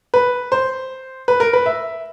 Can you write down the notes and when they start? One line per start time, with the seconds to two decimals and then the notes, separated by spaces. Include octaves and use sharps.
0.14 B4
0.52 C5
1.28 B4
1.40 A#4
1.53 B4
1.66 E5